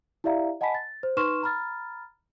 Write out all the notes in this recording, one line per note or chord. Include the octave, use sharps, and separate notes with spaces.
E4 G4 D5 E5 F5 A#5
D#5 F#5 G#5 A5 B5 B6
A6
C5
D#4 B4 C6 C#6 F6 E7
A#5 B5 F6 A6